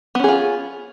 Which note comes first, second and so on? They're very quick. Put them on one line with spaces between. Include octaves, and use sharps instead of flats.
B3 C#4 G#4 F4